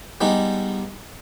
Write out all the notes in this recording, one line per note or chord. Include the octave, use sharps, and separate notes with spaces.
G3 G#3 B3 D#4